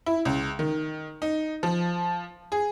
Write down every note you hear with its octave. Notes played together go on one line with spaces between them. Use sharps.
E4
C#2
D#3
D#4
F3
G#4